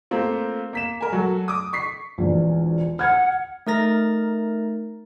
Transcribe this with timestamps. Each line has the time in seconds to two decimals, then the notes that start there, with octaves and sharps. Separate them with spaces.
0.11 A3 A#3 C4 F4
0.73 A#3 B6 E7
1.01 A#4 G#5
1.12 F#3 F#4 A4
1.48 D6 D#6
1.73 C#6 B6 C7
2.18 E1 A#1
2.99 F#5 F6 G#6
3.67 A3 D#4 A#4 A#5 A6 A#6